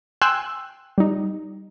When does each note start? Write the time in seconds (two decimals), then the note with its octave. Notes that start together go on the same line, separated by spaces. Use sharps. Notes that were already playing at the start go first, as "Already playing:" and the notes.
0.22 G5 G#5 C6 E6 F#6
0.98 G3 D#4